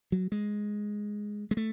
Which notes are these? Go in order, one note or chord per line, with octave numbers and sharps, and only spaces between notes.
F#3
G#3
G#3
A3